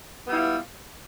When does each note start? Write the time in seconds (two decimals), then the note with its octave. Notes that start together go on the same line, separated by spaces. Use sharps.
0.24 B3
0.28 G3
0.32 E4
0.36 F4